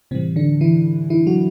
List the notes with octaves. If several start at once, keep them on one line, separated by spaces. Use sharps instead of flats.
A2 C3 E3 G3 C4
D3 D4
E3 E4
E3 E4
F#3 F#4